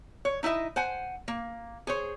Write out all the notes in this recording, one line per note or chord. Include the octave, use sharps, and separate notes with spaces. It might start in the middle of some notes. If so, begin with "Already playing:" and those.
C#5
D#4 E4 D#5 E5
C5 F#5 G#5
A#3
G#4 C5 C#5